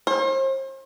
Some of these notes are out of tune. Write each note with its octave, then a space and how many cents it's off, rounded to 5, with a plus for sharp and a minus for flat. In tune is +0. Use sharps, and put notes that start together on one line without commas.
C5 +40